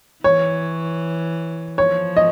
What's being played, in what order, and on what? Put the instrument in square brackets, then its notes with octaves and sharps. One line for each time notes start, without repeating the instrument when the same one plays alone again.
[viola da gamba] E3 [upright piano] C#5
[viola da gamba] F3 [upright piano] C#5
[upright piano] D#5